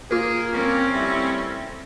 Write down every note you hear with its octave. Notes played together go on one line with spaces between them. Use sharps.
A#3 F4 G#4 A#4
C4 C#4
G3 A3 E4